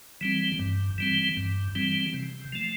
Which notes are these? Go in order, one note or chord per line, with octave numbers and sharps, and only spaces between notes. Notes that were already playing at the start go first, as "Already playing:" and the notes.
E3 G3 C4
G2
E3 G3 C4
G2
E3 G3 C4
C3
F3 A3